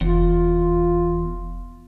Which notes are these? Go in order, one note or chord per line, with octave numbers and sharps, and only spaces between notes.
F1 E2 F4